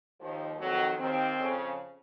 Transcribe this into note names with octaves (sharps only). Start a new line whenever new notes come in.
D#2 D#3 F3
F2 D#3 F#3
D#2 D#3 C4
F2 C#3